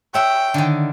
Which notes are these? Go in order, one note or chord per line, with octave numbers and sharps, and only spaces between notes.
C#5 E5 F#5 G5
D3 D#3